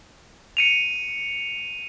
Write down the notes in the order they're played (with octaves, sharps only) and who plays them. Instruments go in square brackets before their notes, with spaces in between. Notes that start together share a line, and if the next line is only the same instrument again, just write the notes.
[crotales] C#7 D#7 F7